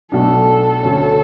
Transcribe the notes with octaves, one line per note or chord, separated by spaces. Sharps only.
B1 B2 A3 D4 A4
D2 D3 A3 C#4